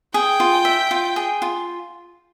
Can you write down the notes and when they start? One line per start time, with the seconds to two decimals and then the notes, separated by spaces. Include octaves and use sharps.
0.14 G#4 G5
0.40 F4
0.65 E5
0.91 F4
1.16 G#4
1.42 F4